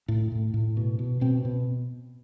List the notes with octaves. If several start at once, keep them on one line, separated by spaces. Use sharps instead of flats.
A2
A2
A2
B2
B2
B2 C4
B2